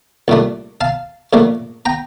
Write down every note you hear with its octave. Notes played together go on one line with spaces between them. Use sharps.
C2 A#2 A3 D4
F5 A5
A#1 A#2 A3 D4
G5 A#5